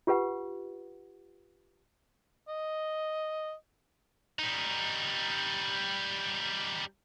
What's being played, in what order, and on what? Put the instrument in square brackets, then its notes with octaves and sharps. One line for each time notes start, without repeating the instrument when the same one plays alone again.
[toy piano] F4 G4 B4 F#5
[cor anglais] D#5
[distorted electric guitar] G3 D#4